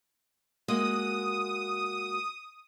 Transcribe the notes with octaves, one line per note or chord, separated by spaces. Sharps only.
G#3 A#3 F#4 D#6